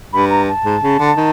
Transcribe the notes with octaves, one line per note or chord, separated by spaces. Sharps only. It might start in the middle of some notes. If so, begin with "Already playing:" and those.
G2 B5
A#5
A5
G#2
C#3
D3
D#3